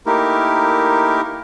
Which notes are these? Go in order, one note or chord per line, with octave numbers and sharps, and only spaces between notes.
A3 A#3 D#4 E4 G4 A#4